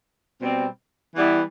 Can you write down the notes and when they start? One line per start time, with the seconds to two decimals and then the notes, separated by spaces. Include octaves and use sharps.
0.40 B2 G3 C4
1.15 E3 G3 B3 E4